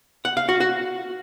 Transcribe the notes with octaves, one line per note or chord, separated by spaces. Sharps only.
F#5
F5
F#4
F#4